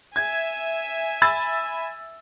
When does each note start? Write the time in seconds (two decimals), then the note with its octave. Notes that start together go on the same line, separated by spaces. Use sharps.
0.16 E5 G#5 G#6
1.22 B5 E6 A6